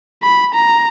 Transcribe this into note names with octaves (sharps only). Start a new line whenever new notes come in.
B5
A#5